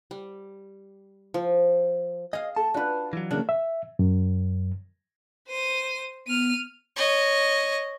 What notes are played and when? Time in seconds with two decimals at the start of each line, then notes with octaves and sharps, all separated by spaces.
0.11 G3
1.34 F3
2.33 G#4 D#5 F5
2.56 A4 A5
2.74 D4 F4 F#4 B4
3.13 E3 F#3
3.31 C#3 A3 A#3 D4
3.49 E5
3.99 F#2
5.48 C5 D#7
6.27 B3 F6 D#7
6.96 C#5 D#5